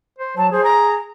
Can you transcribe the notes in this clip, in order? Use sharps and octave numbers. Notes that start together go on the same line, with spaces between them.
C5
F#3 A5
G#4 C5
A#5